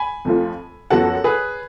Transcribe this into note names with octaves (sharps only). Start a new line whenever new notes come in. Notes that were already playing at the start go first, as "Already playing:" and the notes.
Already playing: G#5 B5
F2 F3 A3 F4
F#2 F3 B3 F#4 A4 F#5 A5
G#4 B4